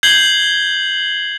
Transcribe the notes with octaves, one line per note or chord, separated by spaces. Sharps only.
G6 G#6 C7 F#7 G7